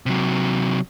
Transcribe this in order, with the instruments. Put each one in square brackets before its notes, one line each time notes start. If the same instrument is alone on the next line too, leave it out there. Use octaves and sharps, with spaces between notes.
[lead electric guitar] C3 F#3